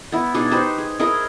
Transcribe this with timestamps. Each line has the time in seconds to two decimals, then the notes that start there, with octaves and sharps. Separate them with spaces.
0.12 B3 E4
0.34 B2 D4 D#4 G#4
0.51 D#4 G4 B4 C5
0.78 G#4
0.99 E4 G#4 A#4 D#5